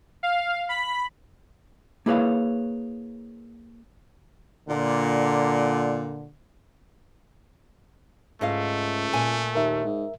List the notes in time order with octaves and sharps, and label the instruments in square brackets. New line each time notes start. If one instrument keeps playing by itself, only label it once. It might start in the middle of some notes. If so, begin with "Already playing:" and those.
[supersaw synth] F5
B5
[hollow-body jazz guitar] A#3 E4 G#4 B4 C#5 F5
[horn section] A#2 D3
[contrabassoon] C#2 [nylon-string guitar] G#2 D#5 F5 [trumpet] A3
[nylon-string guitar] A#2 G#5
[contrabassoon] D#2 [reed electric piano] A#4 E5
[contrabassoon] G#2